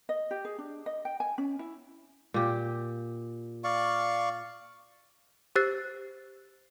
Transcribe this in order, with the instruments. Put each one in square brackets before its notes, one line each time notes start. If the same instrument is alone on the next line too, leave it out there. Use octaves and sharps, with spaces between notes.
[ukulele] D#5
G4
G#4
D4
D#5
G5
G#5
C#4
E4
[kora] A#2 G4
[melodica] D5 F5 C#6
[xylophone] G4 C5 E6 F#6 A6 C7